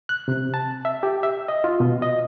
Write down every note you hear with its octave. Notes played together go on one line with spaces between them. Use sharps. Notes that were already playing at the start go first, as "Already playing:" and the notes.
F#6
C3
A5
E5
G4
E5
D#5
F4
B2
D#5